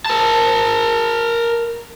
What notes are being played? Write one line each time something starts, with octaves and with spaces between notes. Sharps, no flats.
A#4 A5